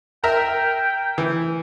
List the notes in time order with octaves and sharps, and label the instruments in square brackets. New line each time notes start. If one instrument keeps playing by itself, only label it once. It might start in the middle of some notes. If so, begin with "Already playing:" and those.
[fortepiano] A#4 E5 A#5 [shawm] G5
[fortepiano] E3